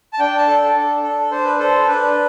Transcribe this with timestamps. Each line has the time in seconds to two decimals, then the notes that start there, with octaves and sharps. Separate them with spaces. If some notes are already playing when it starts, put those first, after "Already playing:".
0.13 A5
0.19 D4 G5
0.38 A5
0.48 A4
0.76 D4
1.03 A4
1.31 D4 C5
1.45 B4
1.58 A4 C5
1.87 D4 B4